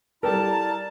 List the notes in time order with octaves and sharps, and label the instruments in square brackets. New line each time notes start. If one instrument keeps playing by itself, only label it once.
[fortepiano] G3 A4 A#4 [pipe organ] E4 D5 A#5 [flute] A5